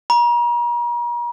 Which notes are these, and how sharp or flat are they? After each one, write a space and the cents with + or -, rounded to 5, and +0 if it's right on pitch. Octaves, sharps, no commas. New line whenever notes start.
A#5 +40